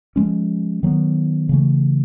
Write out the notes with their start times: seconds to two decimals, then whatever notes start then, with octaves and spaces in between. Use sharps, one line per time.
0.16 F3 G#3 C#4
0.83 D#3 F#3 B3
1.49 C#3 E3 A3